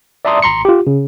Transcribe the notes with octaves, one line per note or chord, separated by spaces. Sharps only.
D5 E5 A5 A#5 C6 D#6
G#1 A#5 C6 C#7
F4 G4
C#3